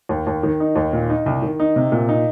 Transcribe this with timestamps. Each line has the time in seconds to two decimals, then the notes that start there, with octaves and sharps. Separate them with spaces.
0.09 D#2
0.27 D#2
0.43 D#3
0.60 D#4
0.76 D#2
0.93 A#2
1.09 D#4
1.26 C2
1.42 D#3
1.60 D#4
1.76 C3
1.92 A#2
2.09 D#4